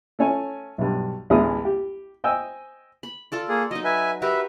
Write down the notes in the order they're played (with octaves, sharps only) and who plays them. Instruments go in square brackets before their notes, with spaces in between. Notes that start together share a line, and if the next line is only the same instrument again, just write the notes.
[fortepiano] A3 C#4 C#5 G#5
B1 G2
A1 D2 G#3 B3 E4 D#6
G4
C5 D#5 G5 G#5 E6
[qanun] B5
F4 A4 D5
[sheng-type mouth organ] A#3 G#4
[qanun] F#3 D#4 [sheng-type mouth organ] D#5
[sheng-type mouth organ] B4 E5 G#5
[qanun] F#4 G4 A#4 [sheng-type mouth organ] B4 E5